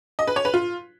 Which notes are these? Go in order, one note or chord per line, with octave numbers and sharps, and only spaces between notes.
D#5
B4
C#5
B4
F4